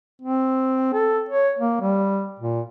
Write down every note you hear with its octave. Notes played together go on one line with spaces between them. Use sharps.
C4
A4
C#5
A#3
G3
A#2